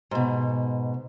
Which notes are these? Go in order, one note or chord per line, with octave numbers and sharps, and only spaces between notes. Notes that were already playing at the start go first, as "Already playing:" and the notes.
G#2 B2